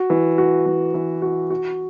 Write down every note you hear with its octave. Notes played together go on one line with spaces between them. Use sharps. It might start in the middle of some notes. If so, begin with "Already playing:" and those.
Already playing: F#4
E3
F#4
E3
E3
F#4
F#4